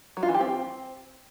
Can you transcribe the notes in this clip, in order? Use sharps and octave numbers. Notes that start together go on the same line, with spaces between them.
F#3
F4
E3
G4
C4